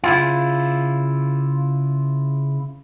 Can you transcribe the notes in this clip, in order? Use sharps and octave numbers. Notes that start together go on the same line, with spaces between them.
C#3 E4 F4